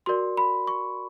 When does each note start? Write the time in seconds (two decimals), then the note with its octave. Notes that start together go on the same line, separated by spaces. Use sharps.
0.06 F#4 A#4 D5 C6
0.37 B5
0.67 C#6